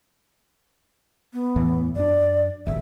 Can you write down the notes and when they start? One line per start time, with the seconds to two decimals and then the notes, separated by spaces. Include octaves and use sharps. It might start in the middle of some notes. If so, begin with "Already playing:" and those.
1.33 B3
1.56 E2 A2 E3
1.96 F#2 D4 D5
2.67 D#1 G#1 E5